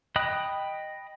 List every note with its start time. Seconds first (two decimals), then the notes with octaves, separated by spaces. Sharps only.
0.16 D#5 G5 B5 D#6 F#6